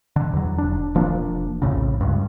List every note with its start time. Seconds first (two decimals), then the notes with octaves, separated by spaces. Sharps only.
0.16 D3
0.33 E2 F#3
0.58 E1 D4
0.95 E1 F3 A#3 D4
1.62 A#1 F2 A2 C#3
2.01 C#2 G2